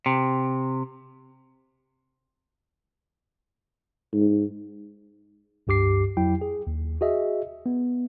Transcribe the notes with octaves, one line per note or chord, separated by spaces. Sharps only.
C3
G#2
C#2 G2 G4 D6 C7
F2 F#3 E4 G5
G#4
D#2
F#4 G#4 D#5 E5
B3